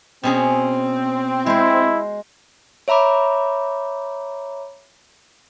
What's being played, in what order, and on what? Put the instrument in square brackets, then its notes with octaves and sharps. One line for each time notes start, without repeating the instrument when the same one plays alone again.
[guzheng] B2 C#4 G#4 [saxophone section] C4
[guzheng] G#3 C5 [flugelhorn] E4
[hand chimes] C#5 E5 A#5 B5 D6